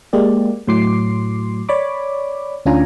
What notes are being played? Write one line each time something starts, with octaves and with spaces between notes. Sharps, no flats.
G#3 A#3 G4 D5
A2 F#3 C6 D6 C7
C#5 D5 B5 D6
D2 C#4 D4 F4 G#5 A#5